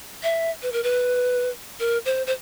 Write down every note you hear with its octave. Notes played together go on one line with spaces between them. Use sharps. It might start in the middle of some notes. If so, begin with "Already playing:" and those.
E5
B4
A#4
B4
A#4
C5
C5